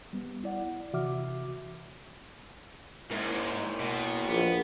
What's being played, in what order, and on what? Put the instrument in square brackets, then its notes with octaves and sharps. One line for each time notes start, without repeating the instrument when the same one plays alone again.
[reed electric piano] G3 B3
E4 D5 F#5
C3 E3 F#4 E5 D6 F6
[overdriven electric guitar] G#2 [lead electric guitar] A#3 E4
[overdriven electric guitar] B2
[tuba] A#1 [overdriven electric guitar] B3